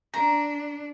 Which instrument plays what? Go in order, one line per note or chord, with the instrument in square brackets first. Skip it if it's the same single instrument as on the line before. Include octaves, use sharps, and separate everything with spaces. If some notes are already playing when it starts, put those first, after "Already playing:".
[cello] D4 [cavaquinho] A#5